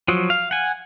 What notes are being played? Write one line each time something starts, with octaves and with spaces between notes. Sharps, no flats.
F3 F#3
F5
F#5 G#5